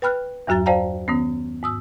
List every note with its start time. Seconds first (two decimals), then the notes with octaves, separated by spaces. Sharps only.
0.02 B4 G5 B5 F6 F#6
0.47 E2 G2 F#3 F#4 A#5 A6
0.66 C5 D5 F5 G5 A5 A#5
1.08 D#3 B3 C#4
1.63 G#2 D#6 E6